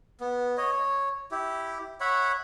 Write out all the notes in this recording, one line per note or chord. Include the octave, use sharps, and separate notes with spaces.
B3
C#5 D#5
C#5
E4 G4
C#5 E5 F#5 B5